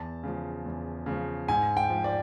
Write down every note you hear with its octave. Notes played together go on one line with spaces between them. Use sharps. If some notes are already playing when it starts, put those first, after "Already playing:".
Already playing: E2 A5
C#3 F3
E2
C#3 F3
G#2 G#5
G5
F3
D5